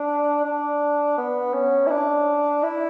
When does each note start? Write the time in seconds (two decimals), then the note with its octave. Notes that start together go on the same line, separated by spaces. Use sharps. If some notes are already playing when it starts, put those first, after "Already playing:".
Already playing: D4
0.45 D4
1.18 B3
1.54 C#4
1.86 E4
1.90 D4
2.63 E4